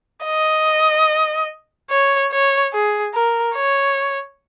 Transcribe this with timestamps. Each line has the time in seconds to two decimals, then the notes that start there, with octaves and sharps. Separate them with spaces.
0.24 D#5
1.90 C#5
2.32 C#5
2.73 G#4
3.14 A#4
3.56 C#5